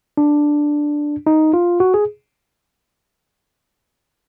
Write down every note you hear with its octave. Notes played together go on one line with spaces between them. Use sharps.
D4
D#4
F4
F#4
G#4